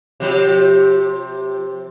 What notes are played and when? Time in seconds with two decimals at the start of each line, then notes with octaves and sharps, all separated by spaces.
0.20 C3 F3 G4